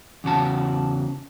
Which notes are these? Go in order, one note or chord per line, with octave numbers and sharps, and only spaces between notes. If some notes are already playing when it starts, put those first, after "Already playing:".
E2 C#3 F#4 A5